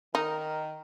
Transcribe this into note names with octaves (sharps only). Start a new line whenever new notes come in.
D#3 D#4 A#4